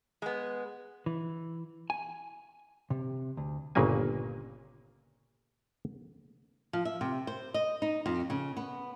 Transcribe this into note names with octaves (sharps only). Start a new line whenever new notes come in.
G#3 B3
E3
G#5
C3
D2
G1 A#2 C#3 A#3 G#5
F3
E5
C3
C5
D#5
D#4
F2
C#3
B3